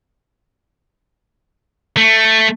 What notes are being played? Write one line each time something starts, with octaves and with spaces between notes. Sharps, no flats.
A3